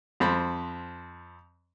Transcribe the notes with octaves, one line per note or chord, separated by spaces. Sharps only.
F2 C4 B5